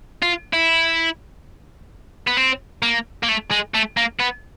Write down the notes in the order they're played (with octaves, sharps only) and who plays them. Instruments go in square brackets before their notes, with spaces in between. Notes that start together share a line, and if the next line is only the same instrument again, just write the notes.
[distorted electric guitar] F4
E4
B3
C4
A#3
A#3
A3
G#3
A3
A#3
B3